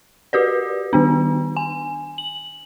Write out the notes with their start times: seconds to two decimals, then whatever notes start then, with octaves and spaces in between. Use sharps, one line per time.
0.33 F#4 G4 B4 D5
0.93 D#3 B3 D4
1.57 G#5
2.18 F#7